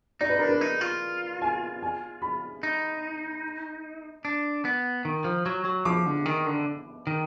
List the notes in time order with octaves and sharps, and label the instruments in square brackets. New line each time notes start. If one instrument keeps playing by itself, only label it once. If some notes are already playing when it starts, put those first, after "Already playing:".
[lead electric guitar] D#4 [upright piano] D5
[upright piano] B4
[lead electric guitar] D4 [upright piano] A#4
[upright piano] B4
[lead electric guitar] D#4
F4
[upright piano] G#5
G#5
B5
[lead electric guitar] D#4
D4
B3
D#3
F3
F#3
F#3
[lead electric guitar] F3 [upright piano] D6
[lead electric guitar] D3
D#3
D3
D#3